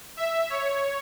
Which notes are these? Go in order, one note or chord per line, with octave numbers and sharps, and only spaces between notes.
E5
C#5